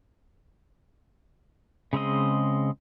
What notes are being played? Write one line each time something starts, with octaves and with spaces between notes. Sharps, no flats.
C#3 G#3 C4 D#5